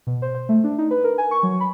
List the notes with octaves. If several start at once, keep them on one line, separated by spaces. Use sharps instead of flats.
B2
C5
C5
A3
D4
D#4
B4
A#4
G#5
C#6
F#3
B5